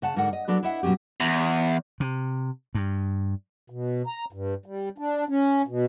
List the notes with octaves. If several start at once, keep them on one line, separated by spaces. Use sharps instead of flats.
C#3 F#5 A5
G#2 D3 A#4 F#5
D#5
F#3 D4 A4 B4
E4 B4 D#5 E5 F#5
B2 F#3 C4 C#4 G4
E2
C3
G2
B2
A#5
G2
G3
D4
C#4
B2